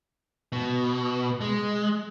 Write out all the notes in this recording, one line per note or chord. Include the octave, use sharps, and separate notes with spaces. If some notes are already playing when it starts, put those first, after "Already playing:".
B2
G#3